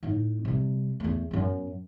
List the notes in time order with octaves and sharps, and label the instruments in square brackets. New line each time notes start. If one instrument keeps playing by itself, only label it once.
[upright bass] A2 D#4
C3 G3
E2 A3
F#2 B3